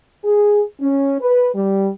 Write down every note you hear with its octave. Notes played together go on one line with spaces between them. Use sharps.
G#4
C#4
B4
G3